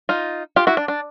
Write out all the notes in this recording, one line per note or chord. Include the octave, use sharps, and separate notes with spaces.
D#4 F4
F4 G4
E4 F#4
D4
D4